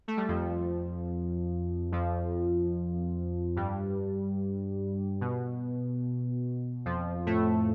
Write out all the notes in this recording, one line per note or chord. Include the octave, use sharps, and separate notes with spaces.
A3
G3
F2 F3
F2 F3
G2 G3
B2
F2 F3
A2 A3